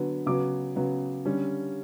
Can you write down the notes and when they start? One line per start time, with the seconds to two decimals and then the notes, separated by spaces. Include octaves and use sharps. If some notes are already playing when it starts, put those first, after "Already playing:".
Already playing: D3 F#3 B3
0.26 C#3 F#3 B3 D6
0.76 C#3 F#3 B3
1.25 D3 G3 C#4